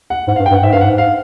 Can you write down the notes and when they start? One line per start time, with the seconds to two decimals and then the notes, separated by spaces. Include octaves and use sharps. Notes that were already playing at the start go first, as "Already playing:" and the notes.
0.10 F#5
0.28 G#2 F#5
0.36 F5
0.40 G2
0.46 G5
0.51 G2
0.54 F#5
0.63 G#2 E5
0.73 G2 F5
0.81 F#5
0.85 G#2
0.98 F5